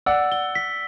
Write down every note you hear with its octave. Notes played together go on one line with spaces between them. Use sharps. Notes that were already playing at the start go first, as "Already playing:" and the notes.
D5 F#5 E6
G7
B6